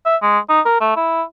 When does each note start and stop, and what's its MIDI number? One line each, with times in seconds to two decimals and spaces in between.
0.06 0.16 76
0.22 0.39 56
0.49 0.61 63
0.66 0.78 70
0.81 0.95 57
0.96 1.23 64